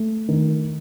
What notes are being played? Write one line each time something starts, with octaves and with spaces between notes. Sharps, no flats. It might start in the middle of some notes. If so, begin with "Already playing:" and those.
Already playing: A3
D#3